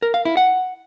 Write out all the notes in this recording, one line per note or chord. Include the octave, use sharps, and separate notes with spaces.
A#4
F5
E4
F#5